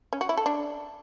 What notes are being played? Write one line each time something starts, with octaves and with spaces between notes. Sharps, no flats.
C#4
F#4
E4
A4
D4